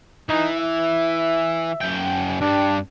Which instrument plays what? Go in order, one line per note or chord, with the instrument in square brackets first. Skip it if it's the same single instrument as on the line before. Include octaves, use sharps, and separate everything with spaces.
[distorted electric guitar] E3 [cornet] D#4
[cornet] E5
[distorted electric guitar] F#2 G5
[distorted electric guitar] G2 [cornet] D4